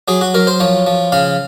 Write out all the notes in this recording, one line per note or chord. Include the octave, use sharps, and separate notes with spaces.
F#3 G#4
F#4
F#3 A#4
C5
F3 C#5
F3
C#3 F5